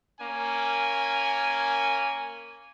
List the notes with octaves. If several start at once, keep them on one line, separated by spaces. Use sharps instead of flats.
A#3 C#4 G#5